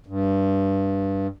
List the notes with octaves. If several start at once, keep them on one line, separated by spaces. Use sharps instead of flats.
G2